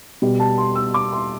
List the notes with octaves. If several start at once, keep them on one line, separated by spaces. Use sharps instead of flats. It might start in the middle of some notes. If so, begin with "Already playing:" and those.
B2 G3
A5
C6
E6
D6
C6